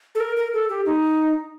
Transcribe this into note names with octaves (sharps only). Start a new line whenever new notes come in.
A4
A#4
A#4
A4
G4
D#4